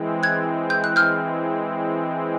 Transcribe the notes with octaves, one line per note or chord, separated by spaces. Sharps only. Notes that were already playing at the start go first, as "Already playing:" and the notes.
Already playing: E3 G#3 C4
F#6 G#6
G6
F#6
F6 G6